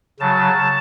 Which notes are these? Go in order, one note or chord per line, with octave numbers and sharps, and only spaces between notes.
C#3 F#3 A5